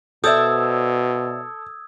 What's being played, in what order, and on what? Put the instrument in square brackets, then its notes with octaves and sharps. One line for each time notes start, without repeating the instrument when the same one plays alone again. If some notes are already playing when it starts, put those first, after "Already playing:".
[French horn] B2 [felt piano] A4 [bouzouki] C5 D5 E5 [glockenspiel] D#6 E6 G#6